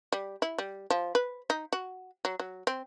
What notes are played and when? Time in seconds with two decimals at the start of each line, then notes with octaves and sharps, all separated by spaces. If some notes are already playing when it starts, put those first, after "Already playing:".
0.12 G3
0.42 E4
0.58 G3
0.90 F3
1.15 B4
1.50 D#4
1.73 F#4
2.25 F#3
2.40 F#3
2.67 C4